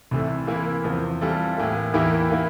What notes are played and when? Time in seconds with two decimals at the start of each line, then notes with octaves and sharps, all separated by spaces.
0.11 C2 C3 E3 A3
0.47 C3 E3 A#3 E4
0.84 E2 C3 F3
1.21 E3 G3 C4 F4 A4
1.58 A2 E3 A#3
1.94 E2 E3 A#3 E4 G4
2.30 E3 A#3 E4